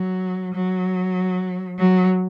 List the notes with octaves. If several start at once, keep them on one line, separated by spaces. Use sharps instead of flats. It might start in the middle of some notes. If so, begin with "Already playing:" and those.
Already playing: F#3
F#3
F#3